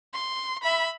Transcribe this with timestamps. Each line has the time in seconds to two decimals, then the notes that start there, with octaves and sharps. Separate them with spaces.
0.14 C6
0.63 E5 B5